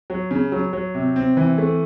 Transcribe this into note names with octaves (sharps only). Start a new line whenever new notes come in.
F#3
C#3
F#3
F#3
C3
C4
E3
A3